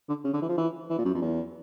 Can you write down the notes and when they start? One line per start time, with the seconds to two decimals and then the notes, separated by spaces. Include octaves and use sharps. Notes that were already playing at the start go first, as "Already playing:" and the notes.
0.09 D3
0.24 C#3
0.34 D3
0.41 E3
0.48 F3
0.57 E3
0.90 E3
0.98 A#2
1.05 F#2
1.14 F2
1.21 E2